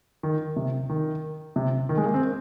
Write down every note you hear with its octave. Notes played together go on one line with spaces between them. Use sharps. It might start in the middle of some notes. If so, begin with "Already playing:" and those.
D#3
C3
D#3
C3
D#3
G#3
A#3
C4